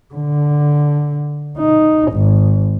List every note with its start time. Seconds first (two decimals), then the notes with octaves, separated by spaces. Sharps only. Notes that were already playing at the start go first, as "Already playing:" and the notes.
0.14 D3
1.58 D#4
2.13 G#1